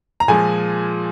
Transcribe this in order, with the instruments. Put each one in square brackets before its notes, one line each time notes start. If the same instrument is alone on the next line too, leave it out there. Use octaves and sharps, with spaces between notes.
[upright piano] A#5
A#2 F3 G#3 G#5